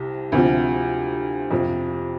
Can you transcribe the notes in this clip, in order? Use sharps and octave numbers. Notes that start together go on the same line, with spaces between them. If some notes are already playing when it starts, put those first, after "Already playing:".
Already playing: C2 C3
D2 C3 F3
F2 C3 F3